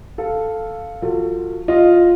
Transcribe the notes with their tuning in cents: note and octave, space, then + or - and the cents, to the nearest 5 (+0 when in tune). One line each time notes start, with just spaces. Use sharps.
A4 +0 F5 +0
F3 -5 F#4 +0 A4 +40
F4 +0 D#5 +0